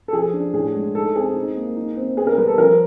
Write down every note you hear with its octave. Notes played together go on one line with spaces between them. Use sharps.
A4
F3 G#4
D4
A2 G#4
G#3
D#4 A4
C4 G#4
D#4
A#3
D#4
C4
B3 G#4
A#4
G3 B4
A4
F3 A#4